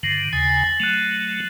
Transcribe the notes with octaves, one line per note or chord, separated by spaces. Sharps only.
G2 D3 D#3 A#6 C7 F#7
D#2 C#3 G#5 A6
F#3 A3 F#6 D#7 F7